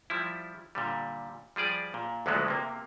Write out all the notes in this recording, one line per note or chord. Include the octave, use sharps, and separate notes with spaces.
F3 G3 E4
A#2 D3 G3
F3 G3 G#4 D5
A#2
D2 D3 F3 F#3 G#3 B3
C3 A#3